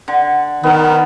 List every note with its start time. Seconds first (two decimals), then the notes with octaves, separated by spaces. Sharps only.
0.08 D3
0.63 D#3 B3 A#4